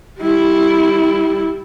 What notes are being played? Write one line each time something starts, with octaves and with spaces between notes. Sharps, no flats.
G3 E4